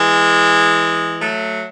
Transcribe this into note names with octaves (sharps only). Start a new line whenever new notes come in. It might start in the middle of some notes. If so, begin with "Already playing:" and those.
Already playing: E3 G#3
F#3 A3